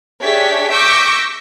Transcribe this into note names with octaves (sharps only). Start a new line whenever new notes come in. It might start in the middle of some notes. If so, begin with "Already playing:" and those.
D4 G4 G#4 C#5 E5 B6
C#6 D6 E6 G6 A#6 B6